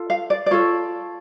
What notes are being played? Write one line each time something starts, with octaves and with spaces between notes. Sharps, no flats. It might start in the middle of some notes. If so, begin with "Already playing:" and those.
Already playing: F4 A4
F5
D5
D5
F4 A4 C#5